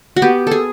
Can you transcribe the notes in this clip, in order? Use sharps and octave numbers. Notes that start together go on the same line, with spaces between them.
F#4
B3 G4
G#4 A4